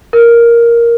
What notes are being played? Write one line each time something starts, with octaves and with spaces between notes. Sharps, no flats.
A#4